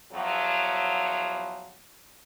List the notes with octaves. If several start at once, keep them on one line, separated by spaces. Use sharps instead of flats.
E2 F3 F#3